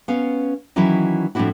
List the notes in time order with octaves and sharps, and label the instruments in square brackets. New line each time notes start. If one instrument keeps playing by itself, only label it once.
[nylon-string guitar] B3 C#4 F5
D#3 E3 F#3 C#4 D#4 E4
A2 F3 C4 D4 E4 F#4